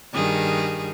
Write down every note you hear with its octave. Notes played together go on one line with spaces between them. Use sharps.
G2 D#3 G#4